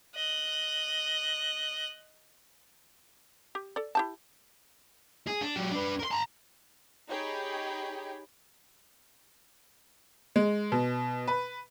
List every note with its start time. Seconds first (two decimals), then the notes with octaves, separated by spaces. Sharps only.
0.15 D#5 F#6
3.55 G4
3.76 A4 D5
3.95 E4 G4 A5
5.27 G#4
5.41 D4
5.56 F#3 G4
5.71 D4 B4
5.99 A#4 C6
6.11 A5 A#5
7.09 D#4 G4 G#4 C#5 G5 B5
10.36 G#3
10.72 B2
11.28 B4